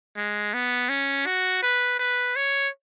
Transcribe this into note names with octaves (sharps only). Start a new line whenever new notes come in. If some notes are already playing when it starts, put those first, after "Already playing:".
G#3
B3
C#4
F#4
B4
B4
C#5